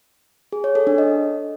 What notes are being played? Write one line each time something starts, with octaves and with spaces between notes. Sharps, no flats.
G#4
C#5
A4
D4
D#5